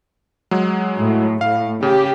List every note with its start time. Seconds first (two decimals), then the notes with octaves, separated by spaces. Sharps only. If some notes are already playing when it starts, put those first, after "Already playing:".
0.51 F#3 G#3 G#4
0.98 A2
1.41 A2 F5
1.83 C#3 G4